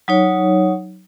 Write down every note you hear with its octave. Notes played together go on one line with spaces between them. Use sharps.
F#3 D#4 C#5